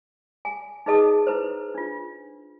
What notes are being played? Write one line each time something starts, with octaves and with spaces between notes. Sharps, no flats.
G#5
D#4 G#4 B4 D#5 A5 D#6
E4 B4 C5
D4 F4